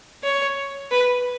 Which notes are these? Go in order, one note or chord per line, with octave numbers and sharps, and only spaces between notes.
C#5
B4